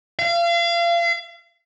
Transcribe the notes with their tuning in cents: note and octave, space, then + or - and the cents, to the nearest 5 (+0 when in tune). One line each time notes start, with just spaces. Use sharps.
F5 -35